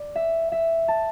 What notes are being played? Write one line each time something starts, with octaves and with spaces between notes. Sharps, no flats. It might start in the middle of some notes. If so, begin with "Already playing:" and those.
Already playing: D5
E5
E5
A5